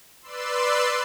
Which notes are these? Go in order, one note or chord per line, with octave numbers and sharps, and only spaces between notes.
B4 D5 C6 E6